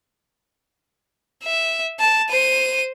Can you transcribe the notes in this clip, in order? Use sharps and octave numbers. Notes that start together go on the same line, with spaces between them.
E5
A5
C5 D#7